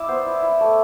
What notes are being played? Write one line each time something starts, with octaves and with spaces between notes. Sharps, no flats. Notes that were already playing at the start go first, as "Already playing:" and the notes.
Already playing: E4 D5 E5
B3 C5
E4
E4
A3